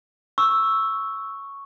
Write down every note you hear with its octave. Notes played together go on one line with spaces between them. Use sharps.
C#6 E6